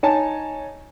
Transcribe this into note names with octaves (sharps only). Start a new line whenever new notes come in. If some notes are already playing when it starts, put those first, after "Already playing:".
D#4 C#5 G#5 A5